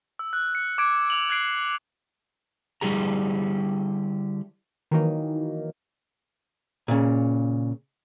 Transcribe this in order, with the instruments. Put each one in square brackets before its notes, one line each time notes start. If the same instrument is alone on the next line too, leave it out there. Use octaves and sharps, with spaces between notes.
[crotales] E6
F#6
C#7
D6 G#6 D7
E6 F7 F#7
F#6 G#6 C7 D7
[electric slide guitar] D3 G3 E4 G4 G#4 A#5
[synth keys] D#3 E3 F#3 A#3 D#4
[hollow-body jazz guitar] A#2 C#3